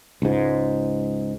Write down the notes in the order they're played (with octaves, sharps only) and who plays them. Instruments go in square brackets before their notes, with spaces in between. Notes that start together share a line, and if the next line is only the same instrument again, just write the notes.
[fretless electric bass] C#2 G#2